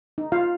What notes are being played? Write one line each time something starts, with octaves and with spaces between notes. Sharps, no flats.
D#4
F4 F5